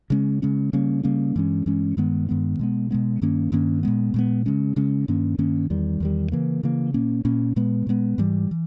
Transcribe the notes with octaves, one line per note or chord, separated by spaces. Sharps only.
C#3 G#3 C#4
C#3 G#3 C#4
C#3 G3 A#3 C#4
C#3 G3 A#3 C#4
G2 E3 G#3 C#4
G2 E3 G#3 C#4
G2 D#3 G#3 B3
G2 D#3 G#3 B3
B2 G#3 B3
B2 G#3 B3
G2 D#3 A#3 C#4
G2 D#3 A#3 C#4
A#2 G#3 B3
A#2 G#3 B3
C#3 G#3 C#4
C#3 G#3 C#4
G2 D#3 A#3 C#4
G2 D#3 A#3 C#4
E2 D#3 G3
E2 D#3 G3
C#3 E3 A#3
C#3 E3 A#3
A#2 A#3 C#4
A#2 A#3 C#4
A#2 G#3 B3
A#2 G#3 B3
G#2 E3 G3
E3